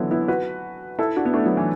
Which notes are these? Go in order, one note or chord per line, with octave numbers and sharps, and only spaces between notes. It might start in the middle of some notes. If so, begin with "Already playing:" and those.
Already playing: D3 E3 F#3 B3 E4
B3 E4
F#4 B4
E4 A4
D4 F#4
B3
A3 D4
F#3 B3
E3